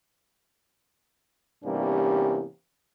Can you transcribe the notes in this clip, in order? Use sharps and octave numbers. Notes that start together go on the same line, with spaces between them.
E2 G2 C3 G3 A#3 C#4